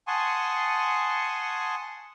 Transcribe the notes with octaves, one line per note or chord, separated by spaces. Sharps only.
F#5 G#5 A5 C6 C#6 D#6